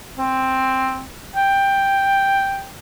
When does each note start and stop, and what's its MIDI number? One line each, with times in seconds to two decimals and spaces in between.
0.18 1.04 60
1.36 2.67 79